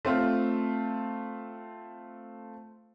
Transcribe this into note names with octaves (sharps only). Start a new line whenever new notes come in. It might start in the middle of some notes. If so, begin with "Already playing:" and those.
A3 C4 F4